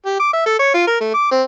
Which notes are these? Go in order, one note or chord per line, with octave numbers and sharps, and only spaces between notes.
G4
D6
E5
A4
C#5
F4
A#4
A3
D6
C4